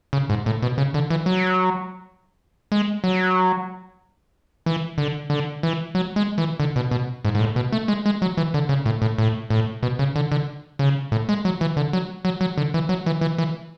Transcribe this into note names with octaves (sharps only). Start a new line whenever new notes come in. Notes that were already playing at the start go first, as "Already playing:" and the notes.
C#3
G#2
A2
B2
C#3
D3
E3
F#3
G#3
F#3
E3
D3
D3
E3
F#3
G#3
E3
D3
B2
B2
G#2
G#2
A2
B2
A3
G#3
G#3
F#3
E3
D3
C#3
A2
A2
A2
A2
B2
C#3
D3
D3
C#3
A2
G#3
F#3
E3
D3
F#3
F#3
F#3
D3
E3
F#3
E3
E3
E3